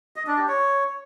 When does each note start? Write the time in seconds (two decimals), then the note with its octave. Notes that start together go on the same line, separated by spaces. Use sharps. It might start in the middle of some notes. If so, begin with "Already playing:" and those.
0.16 D#5
0.27 D4
0.38 G4
0.48 C#5